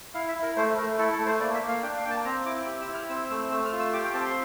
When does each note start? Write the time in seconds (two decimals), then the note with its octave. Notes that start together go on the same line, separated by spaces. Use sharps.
0.14 E4 F5
0.28 E5
0.35 E4
0.42 A#4
0.57 A3 C5
0.77 A3 A#4
0.98 E4 A4
1.13 A4
1.19 A3
1.26 C5
1.40 A#3 D5
1.55 E5
1.62 A#3
1.68 F5
1.83 D4 G5
1.97 F5
2.04 A#3 G5
2.11 A5
2.25 C4 A#5
2.45 E4 D6
2.67 G4
2.81 E6
2.88 E4
2.94 F6
3.09 C4 E6
3.30 A3 E6
3.51 A3 E6
3.65 F6
3.72 F4
3.79 E6
3.93 G4 D6
4.04 G5
4.14 C4 A5
4.25 C6